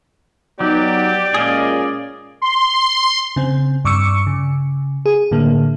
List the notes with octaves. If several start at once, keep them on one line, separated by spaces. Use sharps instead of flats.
F#3 B3 D#4 G4 D5
A#2 G#3 C#4 G#4 D#5 F5
C6
C#3 C4
G2 C#6 D6 E6 C#7
C#3
G#4
A2 D3 A#3